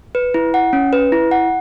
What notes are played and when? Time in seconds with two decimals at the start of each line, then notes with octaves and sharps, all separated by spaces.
0.15 B4
0.34 E4
0.54 F#5
0.73 C#4
0.93 B4
1.12 E4
1.31 F#5